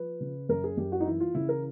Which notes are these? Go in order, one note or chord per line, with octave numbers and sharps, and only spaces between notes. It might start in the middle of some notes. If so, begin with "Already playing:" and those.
Already playing: F3 B4
C#3
F#2 A#4
G#4
F#2 G4
F#4
D#4
E3 E4
F4
C#3 E4
A#4